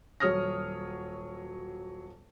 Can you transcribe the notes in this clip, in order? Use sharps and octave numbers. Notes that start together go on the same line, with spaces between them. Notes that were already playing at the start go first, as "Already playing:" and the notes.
D#1 F#3 C#5 D#6 F6 A#6